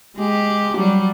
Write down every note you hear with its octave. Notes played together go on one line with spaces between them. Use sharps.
G#3 G4
F#3 G3